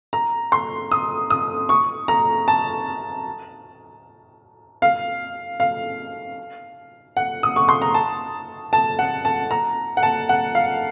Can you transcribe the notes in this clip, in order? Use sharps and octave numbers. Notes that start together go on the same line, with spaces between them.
A#5
C6
D#6
D#6
C#6
A#5
A5
F5
F5
F#5
D#6
C#6
C6
A#5
A5
A5
F#5
A5
A#5
F#5
A5
F#5
F5